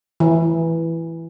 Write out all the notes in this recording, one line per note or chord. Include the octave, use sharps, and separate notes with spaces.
E3